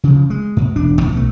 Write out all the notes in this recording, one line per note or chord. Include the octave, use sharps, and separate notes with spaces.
C#3 F3
G#3
G#2
E1 D4
F2 A2 F3
B1 A3